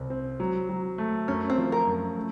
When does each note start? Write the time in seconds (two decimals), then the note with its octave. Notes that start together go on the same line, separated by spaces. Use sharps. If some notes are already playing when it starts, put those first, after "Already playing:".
Already playing: C2 C4
0.10 C4
0.40 F#3
0.69 F#3
0.98 A3
1.28 F#2 C#4
1.50 C4
1.58 F3
1.72 A#4
1.87 F#2
2.16 A3